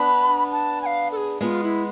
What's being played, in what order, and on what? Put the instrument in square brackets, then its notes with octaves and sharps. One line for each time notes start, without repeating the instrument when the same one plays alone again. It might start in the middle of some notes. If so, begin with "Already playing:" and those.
Already playing: [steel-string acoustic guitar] B3 D4 [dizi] B5
[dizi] A5
G#5
F5
A4
G#4
[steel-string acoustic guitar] G#3 B3 [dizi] F4
[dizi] E4